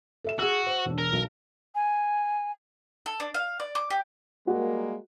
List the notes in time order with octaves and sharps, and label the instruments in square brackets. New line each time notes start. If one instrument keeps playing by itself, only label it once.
[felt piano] A4 E5 E7
[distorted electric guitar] F#4 [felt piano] G#4 E6
[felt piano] C5
E1 D4
[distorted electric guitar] A#4
[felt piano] B1
[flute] G#5
[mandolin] A4
D4
F5
D5
D6
G4
[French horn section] G3 G#3 A#3 [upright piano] F#4